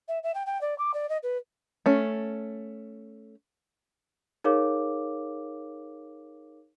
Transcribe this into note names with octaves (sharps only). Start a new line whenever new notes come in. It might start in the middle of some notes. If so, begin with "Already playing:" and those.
E5
E5
G5
G5
D5
D6
D5
D#5
B4
A3 C#4
D#4 G#4 A#4 C#5 F5 D6